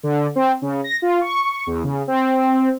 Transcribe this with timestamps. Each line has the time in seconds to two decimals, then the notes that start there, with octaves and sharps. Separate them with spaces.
0.03 D3
0.36 C4
0.62 C#3
0.84 A#6
1.02 F4
1.21 C#6
1.67 E2
1.84 C#3
2.08 C4